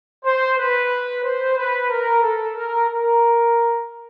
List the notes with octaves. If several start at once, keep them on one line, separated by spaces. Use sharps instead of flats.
C5
B4
C5
B4
A#4
A4
A#4
A#4